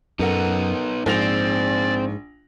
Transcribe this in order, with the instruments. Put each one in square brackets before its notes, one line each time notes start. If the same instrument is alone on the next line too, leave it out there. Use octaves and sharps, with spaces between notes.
[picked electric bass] F#2 [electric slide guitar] B3 D#4 [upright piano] A4 A#4 F#5
[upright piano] A#1 A#6 F7 [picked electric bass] G#2 [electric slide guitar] C4 [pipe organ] D5